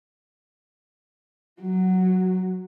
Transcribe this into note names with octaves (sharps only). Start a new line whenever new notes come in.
F#3